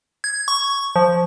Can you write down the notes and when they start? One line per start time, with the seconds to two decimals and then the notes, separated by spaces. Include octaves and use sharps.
0.24 G#6
0.48 C#6
0.96 F3